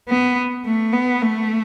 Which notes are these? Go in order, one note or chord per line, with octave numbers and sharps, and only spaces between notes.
B3
A3
B3
A3